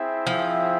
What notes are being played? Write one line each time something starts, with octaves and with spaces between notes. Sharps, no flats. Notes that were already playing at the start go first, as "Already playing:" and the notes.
Already playing: C4 E4 G#4 E5 G5
F3